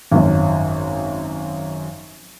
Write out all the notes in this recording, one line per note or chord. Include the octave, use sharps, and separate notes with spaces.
G#1 F#2